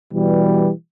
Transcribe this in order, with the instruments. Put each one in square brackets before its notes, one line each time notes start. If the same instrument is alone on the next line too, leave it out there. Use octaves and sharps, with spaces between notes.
[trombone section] B2 E3 G3